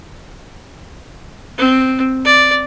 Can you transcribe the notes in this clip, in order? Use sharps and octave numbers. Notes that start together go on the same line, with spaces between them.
C4
D5